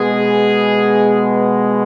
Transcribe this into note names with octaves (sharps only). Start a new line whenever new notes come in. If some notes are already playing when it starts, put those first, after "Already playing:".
Already playing: B2 G#3 B3 G#4